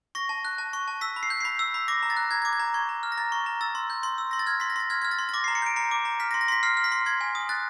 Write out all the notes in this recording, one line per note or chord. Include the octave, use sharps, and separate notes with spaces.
C#6 A#6
A5
F#6
A5
C#6
A5
E6 B6
B5
C7
G6
C7
B5 B6
E6
B5
D6 A#6
A#5
A6
F#6
A#5 G#6
G#6
D6
G#6
A#5
C#6 G#6
A#5
F6
A#6
A#5 A6
C#6
A#5
E6 A6
C6
G6
C6
E6
C6 A#6
A6
F6 G#6
C6 B6
A#6
C6 A6
F6 G#6
F6 G#6
A6
C6
A6
D6 A#6
A#5 C7
C#7
G6 D7
A#5 C#7
D6
A#5
F6 B6
A#6
C6
A#6
C6 B6
F6 C7
F6
B6
C6
C6 G#6
G#5
D#6
F#6 A6